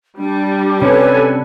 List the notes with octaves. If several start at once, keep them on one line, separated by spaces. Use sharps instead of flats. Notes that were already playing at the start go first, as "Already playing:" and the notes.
G3 D4
C3 C#4 D4 A4 B4 C#5 G#5